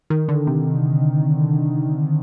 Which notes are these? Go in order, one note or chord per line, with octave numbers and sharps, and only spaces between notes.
D#3
D3
C3